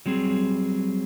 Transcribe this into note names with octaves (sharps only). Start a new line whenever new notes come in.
F#3 G3 C4 G#4